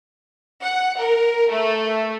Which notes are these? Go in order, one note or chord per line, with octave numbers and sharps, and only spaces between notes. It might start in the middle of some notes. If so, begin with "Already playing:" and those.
F#5
A#4
A3